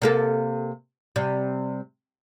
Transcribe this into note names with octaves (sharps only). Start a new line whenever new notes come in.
C3 A#3 A4
C3 G3